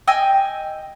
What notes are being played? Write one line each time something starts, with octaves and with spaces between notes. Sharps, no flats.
D#5 G5 G#5 E6